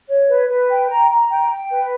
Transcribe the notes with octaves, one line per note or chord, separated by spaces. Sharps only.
C#5
B4
B4
G5
A#5
A#5
G5
G5
B4